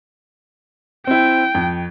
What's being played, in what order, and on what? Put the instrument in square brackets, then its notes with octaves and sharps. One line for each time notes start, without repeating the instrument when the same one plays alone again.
[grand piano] C4 E4 [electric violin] G5
[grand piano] F2